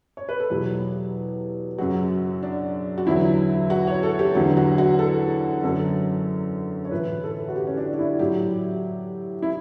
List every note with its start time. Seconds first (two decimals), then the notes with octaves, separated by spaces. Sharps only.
0.17 C#5
0.29 B4
0.40 A4
0.50 E2 B2 F#3 G4
1.78 F#2 C#3 F#3 F#4
2.43 D4
2.98 F#4
3.07 E2 D3 F#3 E4
3.70 F#4
3.87 C#5
4.03 A4
4.19 G4
4.35 E2 D3 F#3 F#4
4.57 F#4
4.78 F#4
4.99 A4
5.63 F#2 D3 F#3 A4
6.85 C#5
6.91 A2 E3 B4
7.24 A4
7.48 F#4
7.56 G4
7.67 C#4
7.77 D4
7.93 D4
7.99 E4
8.19 A2 F#3 G4
9.43 E4